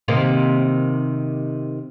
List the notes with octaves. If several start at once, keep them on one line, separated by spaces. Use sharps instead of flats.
C3 D#3 A#3